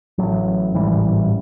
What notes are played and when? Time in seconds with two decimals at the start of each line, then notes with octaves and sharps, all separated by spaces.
0.18 A1 A2 F#3
0.74 A1 G#2 E3 G3